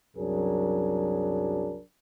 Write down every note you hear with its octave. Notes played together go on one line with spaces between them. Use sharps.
C2 F#2 F#3 D4 G#4 A#4